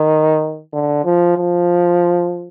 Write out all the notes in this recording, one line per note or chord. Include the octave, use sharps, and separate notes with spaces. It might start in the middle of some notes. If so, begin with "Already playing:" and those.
Already playing: D#3
D3
F3
F3